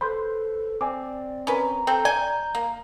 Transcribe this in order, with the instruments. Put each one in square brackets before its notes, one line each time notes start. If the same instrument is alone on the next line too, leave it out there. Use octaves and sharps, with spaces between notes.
[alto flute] A4 [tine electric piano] B4 C5 [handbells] B5 C6 G6
[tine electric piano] C4 [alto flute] D5 [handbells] G#5 D6
[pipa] C#4 B4 [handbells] A#4 G#5 [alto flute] A#5
[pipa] C4 [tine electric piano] A4 G6
[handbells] D5 [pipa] G#5 [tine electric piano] G6
[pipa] A#3